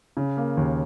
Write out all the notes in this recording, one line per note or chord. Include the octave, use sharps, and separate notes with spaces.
C#3
A#3
D#2